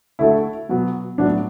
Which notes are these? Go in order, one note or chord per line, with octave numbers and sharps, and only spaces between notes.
D3 A3 E4 F#4 A4
B2 F#3 B3
A2 F#3 B3 D4